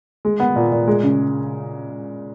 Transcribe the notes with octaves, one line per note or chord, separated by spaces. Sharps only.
G#3
B3
A#2
A#2
G#3
C#3